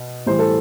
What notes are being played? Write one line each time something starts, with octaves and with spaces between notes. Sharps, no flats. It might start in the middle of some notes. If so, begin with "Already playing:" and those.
Already playing: B2
A2 E3 G3 C5
A4